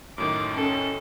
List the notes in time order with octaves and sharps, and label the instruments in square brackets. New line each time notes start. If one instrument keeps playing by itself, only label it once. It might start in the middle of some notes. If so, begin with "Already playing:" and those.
[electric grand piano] F#2 A2 D#3 [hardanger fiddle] D6
[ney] C#4 [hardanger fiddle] A4